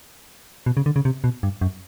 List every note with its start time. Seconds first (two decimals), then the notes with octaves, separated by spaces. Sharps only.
0.66 B2
0.77 C#3
0.86 D3
0.96 C#3
1.05 C3
1.24 B2
1.43 G2
1.61 F#2